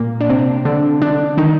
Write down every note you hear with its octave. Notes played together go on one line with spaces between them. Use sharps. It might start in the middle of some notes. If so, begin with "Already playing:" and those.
Already playing: A#2 A#3
D4
C3 C4
D3 D4
D3 D4
D#3 D#4